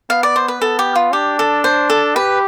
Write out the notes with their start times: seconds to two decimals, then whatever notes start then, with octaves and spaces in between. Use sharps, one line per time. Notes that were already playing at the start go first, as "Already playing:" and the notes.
0.10 B3 F5
0.23 D5
0.36 C5
0.48 B4
0.61 B3 A4
0.79 G4
0.95 F4
1.13 D4 G4
1.39 A4
1.64 C5
1.90 A4
2.16 G4 B4